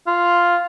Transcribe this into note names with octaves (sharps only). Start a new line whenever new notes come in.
F4